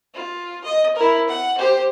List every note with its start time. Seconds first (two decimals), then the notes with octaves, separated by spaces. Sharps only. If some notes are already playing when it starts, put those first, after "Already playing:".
0.14 F4
0.64 D#5
0.96 E4 A#4
1.28 F#5
1.58 G4 C5